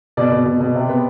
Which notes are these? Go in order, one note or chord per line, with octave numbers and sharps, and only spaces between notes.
B2 D5
B2
B2
B2
C3
B3